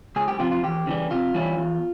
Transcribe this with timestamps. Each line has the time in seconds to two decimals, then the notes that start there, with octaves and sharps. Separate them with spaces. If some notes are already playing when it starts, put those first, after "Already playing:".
0.16 C#2 G#4
0.28 G4
0.39 C3 F3 F4
0.52 F4
0.63 E2 G4
0.87 C#3 E3 G3
1.11 C3 F4
1.34 E3 G3 C#4 E4
1.58 E2